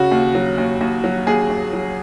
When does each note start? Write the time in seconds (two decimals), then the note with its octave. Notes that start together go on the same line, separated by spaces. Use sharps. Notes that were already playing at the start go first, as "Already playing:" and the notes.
Already playing: C#3 F#4
0.12 D#2
0.35 F#3
0.58 D#2
0.81 D#2
1.04 F#3
1.27 D#2 G#4
1.50 D#2
1.73 F#3